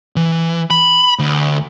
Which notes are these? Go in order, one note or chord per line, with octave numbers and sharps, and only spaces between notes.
E3
B5
D2